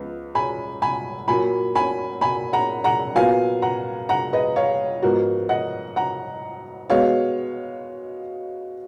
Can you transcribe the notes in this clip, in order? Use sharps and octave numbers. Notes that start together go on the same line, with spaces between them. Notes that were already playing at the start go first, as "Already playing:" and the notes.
Already playing: C#2 F3 B3
G#5 B5
G#5 B5
A#2 F#3 A#3 G#5 B5
G#5 B5
G#5 B5
F#5 A#5
F#5 A#5
A#2 F#3 B3 F5 G#5
F#5 A#5
F#5 A#5
B4 D#5
C#5 F5
G#2 F3 B3 F#4 A#4
D#5 F#5
F#5 A#5
B2 G#3 B3 C#5 F5